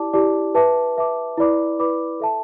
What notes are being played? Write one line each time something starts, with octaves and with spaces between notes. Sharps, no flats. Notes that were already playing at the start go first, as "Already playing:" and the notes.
Already playing: E4 G4 D5 A5 D6
E4 G4 D5 A5 D6
B4 E5 A5 D6
B4 E5 A5 D6
E4 B4 D5 B5 D6
E4 B4 D5 B5 D6
A4 E5 A5